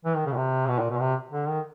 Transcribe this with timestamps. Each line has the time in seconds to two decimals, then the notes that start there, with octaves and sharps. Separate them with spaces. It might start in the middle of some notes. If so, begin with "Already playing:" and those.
0.05 E3
0.16 D#3
0.26 C#3
0.32 B2
0.36 C3
0.68 B2
0.79 A#2
0.90 B2
1.00 C3
1.31 D3
1.48 D#3